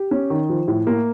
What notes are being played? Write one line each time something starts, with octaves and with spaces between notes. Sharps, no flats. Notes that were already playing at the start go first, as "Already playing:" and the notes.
Already playing: G4
C#4
D#3
F3
A2
A#3